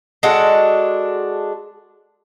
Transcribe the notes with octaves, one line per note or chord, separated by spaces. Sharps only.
G#3 D4 F#4 A4